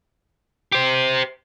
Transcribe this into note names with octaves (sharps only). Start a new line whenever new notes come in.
G4 C5